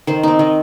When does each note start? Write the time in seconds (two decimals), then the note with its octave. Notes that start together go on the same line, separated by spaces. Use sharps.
0.07 D#3 C5
0.23 C4 D#4
0.39 D#3 D#5